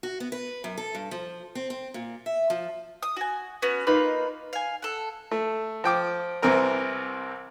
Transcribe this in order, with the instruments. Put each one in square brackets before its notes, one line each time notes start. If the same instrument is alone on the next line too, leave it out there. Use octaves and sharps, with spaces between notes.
[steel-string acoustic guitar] F#4
B3
B4
F#2
A4
G2
F3
C4
C4
A#2
E5
F3
[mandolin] D#6
F#4 G#5
B3 C#4 F#4
A#3 D#4 F4 B4
F5 G#5
A4 F#5
[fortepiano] A3
F3 G5 D6
C2 C3 E3 C4 A#4 A#5